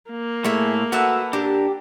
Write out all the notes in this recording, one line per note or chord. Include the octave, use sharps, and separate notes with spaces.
A#3
A2 A3 G#4 E5
F#4 A4 B4 E5 F#5
D4 G4 A#4